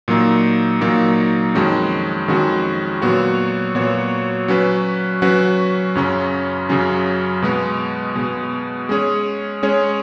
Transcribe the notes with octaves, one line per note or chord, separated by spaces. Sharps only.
A#2 F#3 A#3 D#4
A#2 F#3 A#3 D#4
F2 D#3 G#3 C#4 F#4
F2 D#3 G#3 C#4 F#4
A#2 F#3 B3 F#4 C#5
A#2 F#3 B3 F#4 C#5
F#3 C#4 F#4 B4
F#3 C#4 F#4 B4
F#2 C#3 F#3 C#4
F#2 C#3 F#3 C#4
B2 G#3 B3
B2 G#3 B3
G#3 C#4 G#4 C#5
G#3 C#4 G#4 C#5